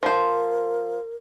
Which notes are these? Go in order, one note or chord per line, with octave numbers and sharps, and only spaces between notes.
F3 A#4 C5